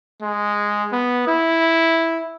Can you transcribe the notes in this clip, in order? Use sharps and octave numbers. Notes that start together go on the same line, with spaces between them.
G#3
B3
E4